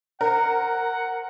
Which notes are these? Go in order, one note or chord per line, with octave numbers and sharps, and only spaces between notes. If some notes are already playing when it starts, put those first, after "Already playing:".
A#4 C5 F#5